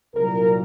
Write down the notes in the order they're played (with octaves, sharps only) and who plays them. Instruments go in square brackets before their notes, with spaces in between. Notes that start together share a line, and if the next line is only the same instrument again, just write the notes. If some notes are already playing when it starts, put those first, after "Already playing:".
[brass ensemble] C2 A#2 F#3 A#4